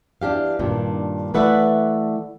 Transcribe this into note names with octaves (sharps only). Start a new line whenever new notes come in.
E3 D4 G4 F5
G2 A#2 D#3 D4
E3 A3 B4 D5 E5 F#5